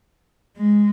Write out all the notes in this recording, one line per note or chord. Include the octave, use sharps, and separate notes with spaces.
G#3